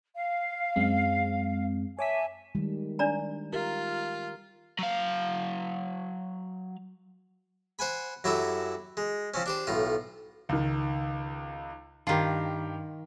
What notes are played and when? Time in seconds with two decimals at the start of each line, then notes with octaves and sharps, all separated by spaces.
0.15 F5
0.76 F#2 G#3 C4
1.99 C#5 E5 G#5 A5 D6 B6
2.55 D#3 G3 G#3
2.99 D4 D5 A#5
3.53 F4 G4 A#4
4.79 F#3 F5
7.79 C5 F#5 G#5 B5
8.24 F#2 F#3 E4 G4 A4
8.97 G#3
9.34 F3 C4 C#4
9.46 D4 G4 C5
9.67 B1 A2 F4
10.49 C#2 D#3
12.07 G2 D#3 F4 G4